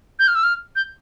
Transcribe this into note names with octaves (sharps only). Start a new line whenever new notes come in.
G6
F6
E6
F6
G6